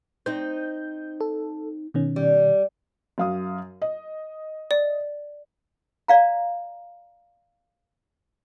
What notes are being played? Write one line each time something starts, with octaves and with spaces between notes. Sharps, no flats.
C4 D#4 G6
A4
B2 D#3 C#4
G3
F#2 F5 D#6
D#5
D5
D5 F5 A#5